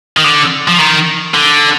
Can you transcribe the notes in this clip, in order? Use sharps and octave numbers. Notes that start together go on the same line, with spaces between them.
D#3
D3
F3
D#3
D3